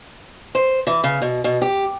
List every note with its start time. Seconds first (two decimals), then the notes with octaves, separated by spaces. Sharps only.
0.55 C5
0.87 E3
1.04 C#3
1.22 B2
1.44 B2
1.62 G4